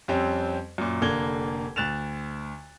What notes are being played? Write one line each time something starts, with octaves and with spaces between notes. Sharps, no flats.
F2 G3 C4 C#4
F#2 A#2
F1 D3 A#3 G#6 G7
D2 F#6 A6 E7 F7